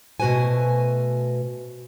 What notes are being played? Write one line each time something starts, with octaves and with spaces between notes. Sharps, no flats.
B2 A3 F#4 B4 C5 G#5